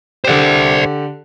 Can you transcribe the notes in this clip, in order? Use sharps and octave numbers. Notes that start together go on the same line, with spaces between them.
D3 G4 C5 D5